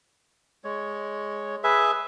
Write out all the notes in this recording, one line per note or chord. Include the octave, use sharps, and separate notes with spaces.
G#3 C#5
G#4 B4 E5